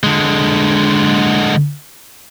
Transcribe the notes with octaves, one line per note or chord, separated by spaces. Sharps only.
D3 G#3